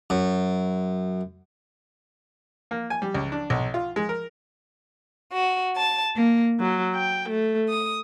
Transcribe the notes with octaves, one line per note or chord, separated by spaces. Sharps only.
F#2
A#3
G#5
G3
C#2
D4
B1
F4
G#3
A#4
F#4
A5
A#3
F#3
G5
A3
D#6